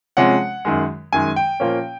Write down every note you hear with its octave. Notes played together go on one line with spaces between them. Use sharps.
C3 F3 G#3 C#4 F#5
F#2 D#3 G#3
F#2 D#3 G#3 G#5
G5
A#2 F3 A#3 C#4